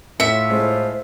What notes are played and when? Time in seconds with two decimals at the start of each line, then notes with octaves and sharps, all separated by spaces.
0.20 A2 F4 E5 B6 C#7
0.50 G#3 C5